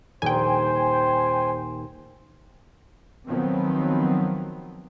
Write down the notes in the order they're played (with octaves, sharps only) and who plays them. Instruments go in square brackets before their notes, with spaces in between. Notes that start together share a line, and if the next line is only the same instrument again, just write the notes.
[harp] D#1 [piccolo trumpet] C5 [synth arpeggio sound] G5 G#5
[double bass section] D#3 F3 F#3 B3 C4